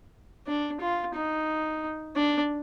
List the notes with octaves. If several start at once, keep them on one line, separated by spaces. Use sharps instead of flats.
D4
F4
D#4
D4